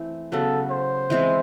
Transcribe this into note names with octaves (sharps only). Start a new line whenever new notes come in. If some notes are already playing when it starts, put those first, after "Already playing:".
Already playing: E3 A3 C4
C#3 F#3 B3 A4
C5
E3 G#3 C4 E4